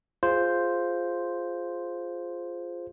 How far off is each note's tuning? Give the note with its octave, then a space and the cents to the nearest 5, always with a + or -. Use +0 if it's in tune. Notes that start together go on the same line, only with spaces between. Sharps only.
F4 +0 G#4 +0 C5 +0